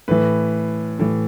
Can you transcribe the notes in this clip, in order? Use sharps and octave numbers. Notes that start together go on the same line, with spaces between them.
A2 E3 B4
A2 E3